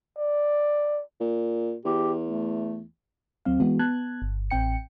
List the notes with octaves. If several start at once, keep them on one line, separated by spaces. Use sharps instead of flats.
D5
A#2
E2 G4
A3
D2 F#3 C4 F5
E3 G#3 B3 F#4
B3 A5 F#6 G#6
G1
A1 C4 G5 C#7